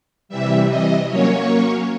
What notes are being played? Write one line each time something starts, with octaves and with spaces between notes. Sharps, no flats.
C3 E3 G3 E5
D#5
F#3 A#3 C#4 C#5